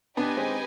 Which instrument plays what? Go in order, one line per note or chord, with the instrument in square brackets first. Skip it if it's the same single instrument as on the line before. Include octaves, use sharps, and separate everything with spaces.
[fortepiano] B3 D4 [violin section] D#4 G4 B4 D#5 G#5
[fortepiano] G#3 C4